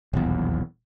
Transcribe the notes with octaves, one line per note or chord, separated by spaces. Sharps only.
D#1 B1 E2